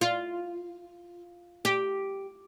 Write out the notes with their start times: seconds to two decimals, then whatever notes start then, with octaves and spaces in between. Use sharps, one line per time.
0.01 F4
1.65 G4